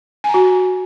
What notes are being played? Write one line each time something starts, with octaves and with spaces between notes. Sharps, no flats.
G#5
A#5
F#4